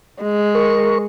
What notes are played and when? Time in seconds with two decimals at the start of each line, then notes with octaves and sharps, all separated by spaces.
0.22 G#3
0.55 A#4 C#6